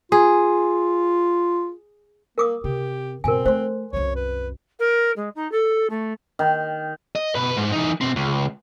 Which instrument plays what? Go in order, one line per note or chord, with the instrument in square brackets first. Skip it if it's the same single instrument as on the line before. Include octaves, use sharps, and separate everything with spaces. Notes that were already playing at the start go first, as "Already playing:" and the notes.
[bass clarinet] F4 [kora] G#4
[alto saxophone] A#3 [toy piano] A#4 D6 D#6
[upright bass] C3 [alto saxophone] G4
[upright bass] G2 B2 [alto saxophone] C4 [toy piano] A#4 G#5
[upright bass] A3 [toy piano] C5 C6
[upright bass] C2 F#2 [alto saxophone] C#5
[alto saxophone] B4
[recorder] A#4
G#3
D#4
A4
A3
[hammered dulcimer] D#3
[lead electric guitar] D#5
B2 B4
G#2
E3 D#4
B2 C4
C#2